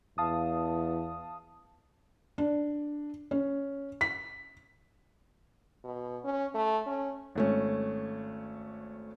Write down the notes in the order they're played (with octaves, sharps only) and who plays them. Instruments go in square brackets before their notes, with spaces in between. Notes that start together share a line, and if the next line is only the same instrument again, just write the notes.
[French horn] E2 [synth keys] F5 A5 D#6
[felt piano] D4
C#4
B6
[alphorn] B2
C#4
A3
C#4
[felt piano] G#1 A3 C#4